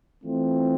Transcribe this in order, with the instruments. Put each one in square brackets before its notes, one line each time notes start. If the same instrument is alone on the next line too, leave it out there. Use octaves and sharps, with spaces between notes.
[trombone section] E3 A3 C4 F4